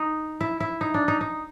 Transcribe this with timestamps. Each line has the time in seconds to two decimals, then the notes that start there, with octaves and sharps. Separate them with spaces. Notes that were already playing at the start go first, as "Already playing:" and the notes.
Already playing: D#4
0.41 E4
0.60 E4
0.81 D#4
0.94 D4
1.08 D#4
1.21 D#4